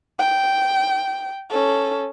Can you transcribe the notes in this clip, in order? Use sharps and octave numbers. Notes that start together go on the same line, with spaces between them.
G5
C#4 A4